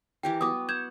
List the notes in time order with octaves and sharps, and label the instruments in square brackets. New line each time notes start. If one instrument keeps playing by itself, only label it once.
[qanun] E3 G4 A#4 [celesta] G5
[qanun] B3 F#4 [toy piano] D6 D#6
[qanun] F#5 [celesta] G6 G#6 E7